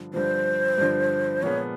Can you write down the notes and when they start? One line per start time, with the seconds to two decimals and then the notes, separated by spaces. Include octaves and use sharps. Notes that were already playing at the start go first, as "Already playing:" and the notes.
Already playing: G2 D3 F3
0.14 G2 D3 F3 C5
0.78 G2 D3 F3
1.43 A#2 F3 G#3 B3 C#5